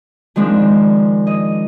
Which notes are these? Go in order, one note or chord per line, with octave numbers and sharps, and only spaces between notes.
D#3 F3 G#3 C4 D4
D#5